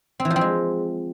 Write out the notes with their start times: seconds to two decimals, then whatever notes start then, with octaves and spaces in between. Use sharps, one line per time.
0.20 C4
0.25 E3
0.30 F3
0.36 C4
0.41 G#3